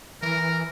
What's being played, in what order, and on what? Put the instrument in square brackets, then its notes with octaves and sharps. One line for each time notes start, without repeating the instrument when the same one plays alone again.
[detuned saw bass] E3 [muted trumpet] A#4